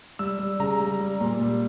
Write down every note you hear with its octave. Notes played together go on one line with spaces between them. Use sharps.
G3 E6
G3
C#3 A#5
G3
G3
A#2
G3